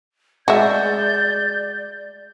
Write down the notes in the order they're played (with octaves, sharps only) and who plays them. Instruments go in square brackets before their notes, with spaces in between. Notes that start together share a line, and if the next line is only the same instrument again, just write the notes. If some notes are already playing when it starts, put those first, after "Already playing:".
[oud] G#3 [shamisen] F#4 E5 [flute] D5 [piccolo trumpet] G6